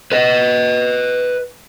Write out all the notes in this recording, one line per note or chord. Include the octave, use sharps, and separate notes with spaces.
B4 D#5